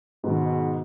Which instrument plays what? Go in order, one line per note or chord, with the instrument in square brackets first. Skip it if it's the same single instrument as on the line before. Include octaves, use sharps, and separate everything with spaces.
[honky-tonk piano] G#2 D#3 [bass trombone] B2